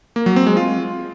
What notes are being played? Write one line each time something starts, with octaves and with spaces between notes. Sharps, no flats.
A#3
F#3
C4
G#3
F4